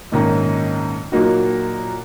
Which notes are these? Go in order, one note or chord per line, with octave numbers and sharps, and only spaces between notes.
A#1 G#2 D#3 A#3 C#4
A#2 F#3 A#3 D#4 F#4